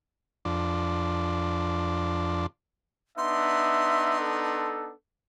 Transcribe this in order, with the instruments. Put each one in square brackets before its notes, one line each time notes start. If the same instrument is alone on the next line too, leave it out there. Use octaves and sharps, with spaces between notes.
[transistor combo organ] F2 D4
[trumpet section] B3 D4 D#4 [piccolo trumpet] E5 [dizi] C6
[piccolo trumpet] A4